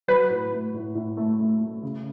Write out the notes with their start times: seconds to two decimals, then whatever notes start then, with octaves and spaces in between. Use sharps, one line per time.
0.08 F#3 B4
0.30 A2
0.52 A3
0.74 A2
0.95 A2
1.17 A3
1.40 A3
1.61 A3
1.83 C#3